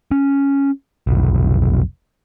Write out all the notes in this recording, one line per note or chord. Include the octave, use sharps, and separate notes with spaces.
C#4
F1 B1